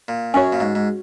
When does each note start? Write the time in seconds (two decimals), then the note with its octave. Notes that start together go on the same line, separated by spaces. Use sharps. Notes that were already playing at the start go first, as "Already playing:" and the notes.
0.08 A#2
0.34 F#2 C#4 F#4 C#5
0.52 A#2
0.60 G#2
0.75 G#2